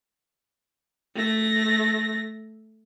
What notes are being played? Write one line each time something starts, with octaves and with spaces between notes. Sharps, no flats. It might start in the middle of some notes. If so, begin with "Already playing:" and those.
A3 A#6